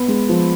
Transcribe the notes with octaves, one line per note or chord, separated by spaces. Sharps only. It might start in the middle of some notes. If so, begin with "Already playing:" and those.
Already playing: B3 B5
G#3
F3